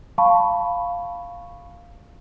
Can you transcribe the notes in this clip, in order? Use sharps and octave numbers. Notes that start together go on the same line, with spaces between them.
F5 A5 B5 C#6